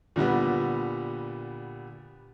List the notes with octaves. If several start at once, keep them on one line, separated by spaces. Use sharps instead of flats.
A#2 D3 G3 B3